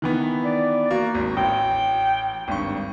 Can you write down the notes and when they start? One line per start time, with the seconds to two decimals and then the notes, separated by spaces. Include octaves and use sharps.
0.02 D#3 E3 B3
0.45 D5
0.91 A#3 F#4
1.15 G#1
1.37 A1 G5
2.48 G#1 G2 C#6